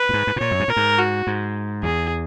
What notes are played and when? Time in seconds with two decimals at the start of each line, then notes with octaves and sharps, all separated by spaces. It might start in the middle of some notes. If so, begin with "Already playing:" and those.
Already playing: B4
0.09 A#2
0.13 G#2
0.27 G#2
0.36 B2
0.41 A#2 C#5
0.51 F#2
0.60 G#2
0.68 A#2 A#4
0.77 G#2
0.98 F#4
1.27 G#2
1.83 E2 G#4